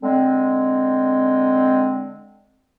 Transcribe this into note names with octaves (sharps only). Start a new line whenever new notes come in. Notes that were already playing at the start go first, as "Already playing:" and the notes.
D3 G#3 C4